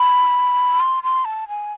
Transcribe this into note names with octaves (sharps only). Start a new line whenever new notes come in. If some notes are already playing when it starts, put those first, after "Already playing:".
Already playing: B5
C6
C6
A5
G#5